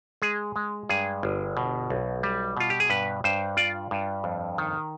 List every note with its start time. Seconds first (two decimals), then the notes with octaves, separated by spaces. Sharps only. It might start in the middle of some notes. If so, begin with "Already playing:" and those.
0.22 G#3 G#4
0.56 G#3
0.89 G2 G#4
1.23 G1
1.57 B2
1.90 B1
2.23 G3
2.57 B2 F4
2.70 G4
2.80 G#4
2.90 G2 B4
3.24 G2 C5
3.57 F4 D5
3.91 G2
4.24 F2
4.58 D#3